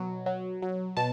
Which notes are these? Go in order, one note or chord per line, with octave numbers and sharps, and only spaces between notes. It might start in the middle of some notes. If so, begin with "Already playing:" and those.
Already playing: B2 F#3
F#3
F#3
B2 A5